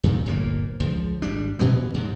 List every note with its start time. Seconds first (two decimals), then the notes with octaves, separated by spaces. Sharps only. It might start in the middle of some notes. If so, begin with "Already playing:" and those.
0.04 F2 A#2 D#3
0.26 D1 G1 A#2 A#3
0.80 C#2 F3
1.22 G#1 G3 D4
1.59 A#2 C#3 E3 B3
1.94 D#2 G#2 C3